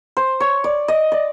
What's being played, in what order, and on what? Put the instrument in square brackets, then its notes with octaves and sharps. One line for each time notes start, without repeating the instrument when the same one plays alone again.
[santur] C5
C#5
D5
D#5
D5